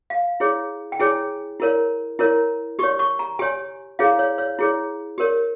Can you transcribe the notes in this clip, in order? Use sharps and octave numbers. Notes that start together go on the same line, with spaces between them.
F5
E4 G#4 C#5
G5
E4 G#4 C#5 G#5
E4 A#4 C#5
E4 A#4 C#5
G4 C#5 C#6
C#6
A#5
G4 C#5 G#5
E4 G#4 C#5 F5
C#5
C#5
E4 G#4 C#5
G4 A#4 C#5